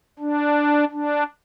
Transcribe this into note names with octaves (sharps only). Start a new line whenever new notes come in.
D4
D4